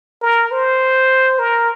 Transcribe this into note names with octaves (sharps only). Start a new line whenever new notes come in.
A#4
C5
A#4